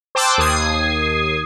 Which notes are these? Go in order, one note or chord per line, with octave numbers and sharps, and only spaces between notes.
C5 G5 A5 D6 E6 F#6
D#2 D#6 G#6 C7